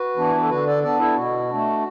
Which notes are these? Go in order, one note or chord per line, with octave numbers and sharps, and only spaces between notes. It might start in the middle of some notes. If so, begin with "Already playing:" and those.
Already playing: F#4 B4
E3 B3 D4
E4
F#4
A4
D3 F#4 B4
A4 D5
B3 D4 A4 D5
E4 A4
B2 F#4
A3 D4